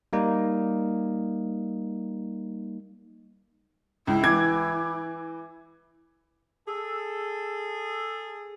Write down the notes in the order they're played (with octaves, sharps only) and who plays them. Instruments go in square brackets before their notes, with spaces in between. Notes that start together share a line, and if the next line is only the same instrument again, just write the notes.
[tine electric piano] G3 A#3 D#4
[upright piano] C#2 [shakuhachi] E4
[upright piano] E3 D6 G#6
[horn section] G#4 A4